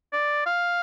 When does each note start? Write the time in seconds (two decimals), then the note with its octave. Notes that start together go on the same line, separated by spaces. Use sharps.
0.13 D5
0.46 F5